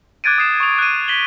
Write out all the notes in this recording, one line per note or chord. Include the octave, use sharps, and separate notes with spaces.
D6 F#6 G#6 A6 D7 D#7
D#6 C7 E7
C#6 D#7 F7
F#6 D#7
G#6 B6 F#7 G7